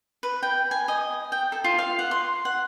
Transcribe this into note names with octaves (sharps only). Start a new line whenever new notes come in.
B4
G5
G#5
D#5
G5
A4
F4
F5
F#5
C6
F#5